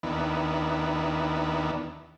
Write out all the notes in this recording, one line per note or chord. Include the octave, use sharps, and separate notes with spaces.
D#2 D#3 B3 D4 E4